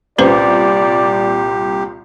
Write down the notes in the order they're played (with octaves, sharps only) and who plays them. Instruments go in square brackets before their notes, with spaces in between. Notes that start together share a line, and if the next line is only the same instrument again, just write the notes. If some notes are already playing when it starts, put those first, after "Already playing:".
[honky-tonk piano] C2 A#2 [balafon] C#4 B4 C5 [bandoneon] G4 [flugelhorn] D5